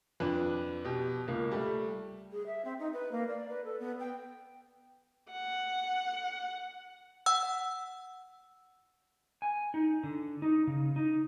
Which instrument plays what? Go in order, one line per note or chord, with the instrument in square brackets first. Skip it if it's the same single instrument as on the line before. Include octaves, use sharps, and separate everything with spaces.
[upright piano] F2 D4 B4
B2 G4
C#2 A#3
G3 A3
[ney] G#4
E5
C4
D#4
B4
A#3
D5
B4
A4
B3
G5
[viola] F#5
[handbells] F#5 E6
[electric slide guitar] G#5
D#4
D3
D#4
C#3
D#4